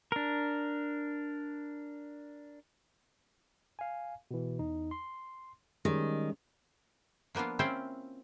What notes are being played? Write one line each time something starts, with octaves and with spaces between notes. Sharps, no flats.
D4 A#4
F5 G#5
B2 E3
E2 D#4
C6
D#3 G3 G#3 C#4
F3 A#3 B3 D4 F4
C4 C#4 E4 F4 C5 G5